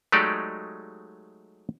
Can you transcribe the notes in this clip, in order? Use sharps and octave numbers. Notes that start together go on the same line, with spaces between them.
F#3 G#3 A3 D#4 G4 D5